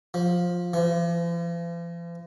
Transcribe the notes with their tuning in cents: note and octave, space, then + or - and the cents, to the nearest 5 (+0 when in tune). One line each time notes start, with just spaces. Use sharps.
F3 +10
F3 -45